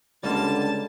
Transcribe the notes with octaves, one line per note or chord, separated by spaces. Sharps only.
C#2 D3 G3 A#3 F4 A5 A6